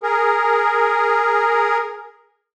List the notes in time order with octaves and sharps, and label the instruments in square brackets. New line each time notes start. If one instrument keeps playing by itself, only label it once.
[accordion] G#4 A#4